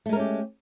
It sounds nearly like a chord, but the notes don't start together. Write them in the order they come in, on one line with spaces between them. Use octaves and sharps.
A3 G#3 A#4 C#4 G4